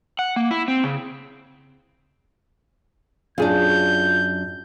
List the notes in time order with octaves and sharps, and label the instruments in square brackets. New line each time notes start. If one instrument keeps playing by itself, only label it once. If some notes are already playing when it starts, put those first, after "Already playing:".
[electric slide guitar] F#5
A#3
E4
C4
C#3
[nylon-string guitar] F#2 D4 [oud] F4 G#4 [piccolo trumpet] G6